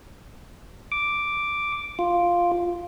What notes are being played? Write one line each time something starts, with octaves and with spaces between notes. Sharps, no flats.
D6
F4